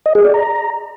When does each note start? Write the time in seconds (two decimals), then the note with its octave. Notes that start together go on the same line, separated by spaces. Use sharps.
0.06 D#5
0.15 G#4
0.25 D5
0.34 A#5